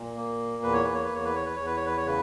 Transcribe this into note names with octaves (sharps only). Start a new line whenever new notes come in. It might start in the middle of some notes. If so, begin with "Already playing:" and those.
Already playing: A#2
A#3
E2 B4
C#5
B4
C#5
B4
E2 C#5
B4
C#5
B4
E2 C#5
B4
C#5
B4
C#5
C#3 B4